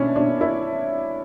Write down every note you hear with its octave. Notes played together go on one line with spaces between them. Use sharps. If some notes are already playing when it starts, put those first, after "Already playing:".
Already playing: B2 C#4 D4 E4
B2 D4
E4